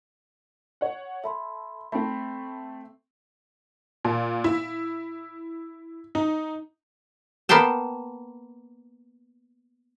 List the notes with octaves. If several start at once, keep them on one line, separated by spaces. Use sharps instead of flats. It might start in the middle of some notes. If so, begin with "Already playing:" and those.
C#5 F#5
A4 E5 B5 C6
A3 C4 B5
A#2
E4
D#4
A#3 B3 C5 G5 A5